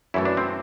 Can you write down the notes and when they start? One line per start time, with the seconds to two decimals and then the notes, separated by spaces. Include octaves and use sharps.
0.14 F#2 E3 A3 E4
0.25 D4
0.37 C4